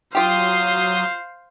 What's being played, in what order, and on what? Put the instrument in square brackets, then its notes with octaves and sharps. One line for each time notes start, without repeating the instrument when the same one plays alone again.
[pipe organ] F#3 C6 D#6 [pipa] F4 G4 [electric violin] C5 F5